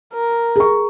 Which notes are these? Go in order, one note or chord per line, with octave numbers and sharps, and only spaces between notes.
A#4
G#4 C#6